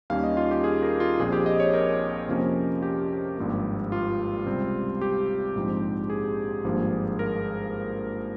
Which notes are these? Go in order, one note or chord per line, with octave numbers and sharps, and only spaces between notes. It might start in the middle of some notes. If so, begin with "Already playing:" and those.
D#2 D#3 G3 A#3 C#4 F5
D#5
F4
G4
G#4
A#4
F4
A#1 A#2 F3 C4 G#4
G4
D#5
C#5
A#4
F2 C3 F3 A#3 C#4
G4
G#1 G2 F3 A#3
F4
C#2 C3 G3 C4
G4
A#1 G#2 F3 C4
G#4
G#1 G2 F3 A#3
A#4